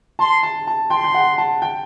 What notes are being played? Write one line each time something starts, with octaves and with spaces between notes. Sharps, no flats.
A5 C6
A5
A5
G5 C6
G5
F#5
A5
G5